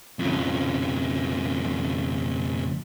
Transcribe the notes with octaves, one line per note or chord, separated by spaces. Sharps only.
F2 C#3